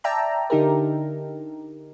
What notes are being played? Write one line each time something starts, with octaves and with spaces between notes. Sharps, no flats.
D5 E5 G5 A5 A#5
D3 D#4 G4 A#4